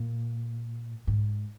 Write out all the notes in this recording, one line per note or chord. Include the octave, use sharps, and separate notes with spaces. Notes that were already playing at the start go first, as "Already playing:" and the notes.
Already playing: A#2
G#2